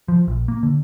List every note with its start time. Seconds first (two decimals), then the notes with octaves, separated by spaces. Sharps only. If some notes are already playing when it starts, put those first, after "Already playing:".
0.08 F3
0.28 A#1
0.48 A#3
0.63 D3